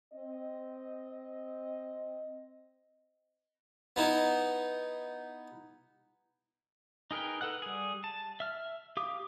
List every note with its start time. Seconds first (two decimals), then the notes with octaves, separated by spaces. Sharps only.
0.13 C4 D#5
3.96 B3 D#4 E4
7.11 D#4 G#4 A#4 B4 G5
7.41 A4 B4 F#5 F#6
7.62 G3 G#4
8.04 A5
8.40 E5 F6
8.97 G4 F5 D6 D#6